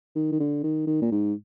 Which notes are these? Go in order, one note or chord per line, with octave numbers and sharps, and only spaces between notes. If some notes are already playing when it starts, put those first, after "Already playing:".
D#3
D#3
D3
D#3
D#3
A#2
G#2